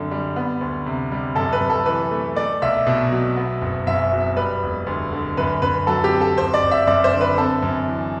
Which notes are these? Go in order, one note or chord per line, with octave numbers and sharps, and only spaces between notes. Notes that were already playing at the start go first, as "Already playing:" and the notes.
Already playing: F#2 D3 C4
G3
B3
D2
C3
G3
F#2 A4
B4
F#2
A4
E3 B4
A3
A3 D5
B1 E5
B2
F#3
B3
F#1
F#2 E5
F#3
G3 B4
E1
D2
D3
F#2 B4
F#2 B4
F#3 A4
G4
C4
A4
F#1 C5
D5
F#1
E5
F#2 D5
C5
D3
B4
C4 A4
F#2
E3